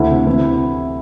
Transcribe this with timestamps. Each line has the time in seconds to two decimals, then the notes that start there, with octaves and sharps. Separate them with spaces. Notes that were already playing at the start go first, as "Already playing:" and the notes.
Already playing: D2 E4
0.10 C3
0.27 E3